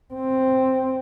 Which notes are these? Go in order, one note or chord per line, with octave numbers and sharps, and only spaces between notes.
C4